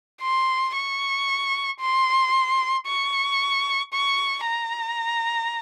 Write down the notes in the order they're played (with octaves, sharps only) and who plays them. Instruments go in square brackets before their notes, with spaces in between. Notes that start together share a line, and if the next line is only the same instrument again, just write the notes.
[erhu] C6
C#6
C6
C#6
C#6
A#5